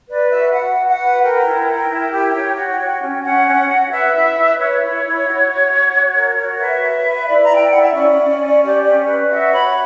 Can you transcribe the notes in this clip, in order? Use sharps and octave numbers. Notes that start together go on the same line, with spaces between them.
B4 D5
F#4 E5
F#4 F#5
F#4
F#5
B4
A#4 G5
E4
A#4
E4
G4
C#5
F#4
F#4
C#4
C#4 F#5
C#4
F#4
B4 E5
E4
B4
B4 C#5
E4
E4
F#4
F#4
F#4
F#4
A#4
F#4
B4 E5
B4
B4
E4 D5
A#5
E4
G5
E4 F#5
E5
C#4 D5
C#4
C#4
G4
C#4
B4
F#4 E5
C#5 B5